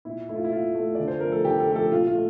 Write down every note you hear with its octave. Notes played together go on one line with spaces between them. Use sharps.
A#2 E4
A3 E4
F4
E4
A#2 F4
A3
D3 D5
C5
F3 A3 A#4
A4
D3 G4
A4
F3 A3 G4
A4
A#2 F4
F4
A3